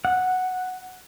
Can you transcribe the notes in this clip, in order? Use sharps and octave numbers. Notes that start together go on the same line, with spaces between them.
F#5